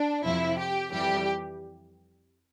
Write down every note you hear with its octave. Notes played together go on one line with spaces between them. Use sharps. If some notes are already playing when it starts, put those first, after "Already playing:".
Already playing: D4
F2 C3 F3 E4
G4
F2 E3 G3 G4